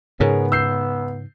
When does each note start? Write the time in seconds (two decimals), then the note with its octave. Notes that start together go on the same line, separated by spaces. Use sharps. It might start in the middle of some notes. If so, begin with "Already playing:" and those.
0.20 G#2 C#3 B3 G#4 A#4 C#5
0.52 E6 G6 C7